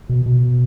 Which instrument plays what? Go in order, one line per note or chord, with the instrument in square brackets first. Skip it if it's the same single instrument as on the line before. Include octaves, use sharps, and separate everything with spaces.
[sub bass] B2
B2